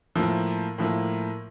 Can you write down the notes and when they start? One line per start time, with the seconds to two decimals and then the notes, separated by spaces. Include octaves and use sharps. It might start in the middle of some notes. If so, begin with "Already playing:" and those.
0.15 A2 F3 A#3
0.78 A2 F3 A#3